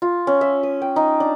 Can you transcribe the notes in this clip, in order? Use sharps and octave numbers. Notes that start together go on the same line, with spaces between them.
F4
C#4
E5
D#6
G5
D#4
D4